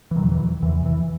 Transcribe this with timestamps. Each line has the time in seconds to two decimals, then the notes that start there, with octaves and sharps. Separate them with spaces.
0.11 E3
0.16 E2 B2 D#3 F#3
0.32 E3
0.62 E2 C3 E3
0.86 E3